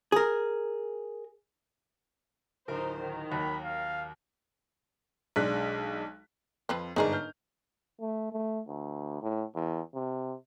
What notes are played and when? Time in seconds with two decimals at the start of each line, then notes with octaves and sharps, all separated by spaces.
0.12 G#4 A#4
2.68 D1 D#4 A#4 C5
3.00 D#3
3.31 D#2 F#3 B5 F#6
3.64 F5
5.36 B1 G#3 D4 F#6 B6
6.69 F2 F3 C4 B4
6.96 G1 G#2 D#4 G#4 A#4 D5
7.13 F6 G6
8.01 A3
8.33 A3
8.67 D2
9.22 A2
9.55 E2
9.94 C3